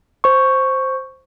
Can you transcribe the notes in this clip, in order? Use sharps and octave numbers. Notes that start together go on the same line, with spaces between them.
C5 C#6